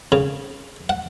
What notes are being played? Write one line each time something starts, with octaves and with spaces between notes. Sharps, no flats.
C#3
F#5